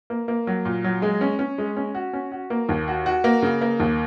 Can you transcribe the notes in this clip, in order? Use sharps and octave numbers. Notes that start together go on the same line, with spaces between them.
A#3
A#3
F#3
A#2
F#3
G#3
C#4
C#4
G#3
C#4
F#4
C#4
F#4
A#3
D#2
F#4
F#4
A#3
C#3
A#3
D#2